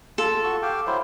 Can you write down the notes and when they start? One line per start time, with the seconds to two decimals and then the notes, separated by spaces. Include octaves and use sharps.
0.18 F4 A4
0.44 F#4 C#6
0.62 G4 F5 G5
0.87 F#3 E4 C5